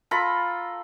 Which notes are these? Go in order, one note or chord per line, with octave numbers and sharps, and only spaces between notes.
F4 A4 A#5 B5